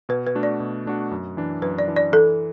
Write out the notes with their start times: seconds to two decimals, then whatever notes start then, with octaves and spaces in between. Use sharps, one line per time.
0.09 B2 B4
0.27 B4
0.35 A3 D4 F#4
0.43 D5
0.60 B2
0.86 A3 D4 F#4
1.11 F#2
1.37 E3 D4
1.62 F#2 B4
1.79 D5
1.88 E3 D4
1.96 D5
2.12 E3 A4